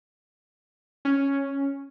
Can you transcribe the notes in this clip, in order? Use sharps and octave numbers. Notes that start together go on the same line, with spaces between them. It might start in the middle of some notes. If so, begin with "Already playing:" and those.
C#4